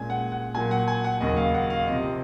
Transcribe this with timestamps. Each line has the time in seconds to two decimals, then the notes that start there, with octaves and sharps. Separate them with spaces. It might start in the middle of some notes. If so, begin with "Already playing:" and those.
Already playing: A#2 G#3 C#4 G#5
0.10 F#5
0.32 F#5
0.54 A#2 F#3 A#3 G#5
0.71 F#5
0.88 G#5
1.05 F#5
1.20 D#2 C#3 F#3 A#3 D#5
1.37 F5
1.54 F#5
1.70 F5
1.87 C3 F3 C4 D#5